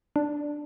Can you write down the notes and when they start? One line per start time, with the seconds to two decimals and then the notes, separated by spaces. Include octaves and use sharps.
0.16 D4